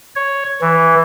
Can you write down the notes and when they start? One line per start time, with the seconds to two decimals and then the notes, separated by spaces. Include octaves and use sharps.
0.16 C#5
0.61 E3